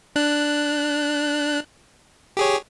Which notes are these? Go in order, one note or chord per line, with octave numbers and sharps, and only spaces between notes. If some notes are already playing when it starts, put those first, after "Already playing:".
D4 F#6
G4 G#4 C#5